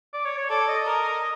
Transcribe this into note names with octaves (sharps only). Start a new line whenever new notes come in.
D5
C#5
C#5
A4 D5
D#5
A#4